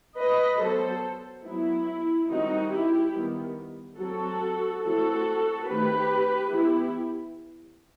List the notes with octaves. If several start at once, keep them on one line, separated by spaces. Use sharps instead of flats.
B4 D#5
F#3 B3 A4 C5
F#3 B3 E4
D#3 G3 C4 D#4 F#4
E4 G4
D#3 G3 B3
F#3 C4 F#4 A4
E3 A3 C4 F#4 A4
D#3 A3 C4 G4 B4
E3 B3 E4 G4